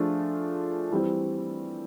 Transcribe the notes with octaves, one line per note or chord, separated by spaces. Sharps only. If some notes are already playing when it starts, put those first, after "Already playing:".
Already playing: F3 A3 D4 F4 G#4
E3 G3 C4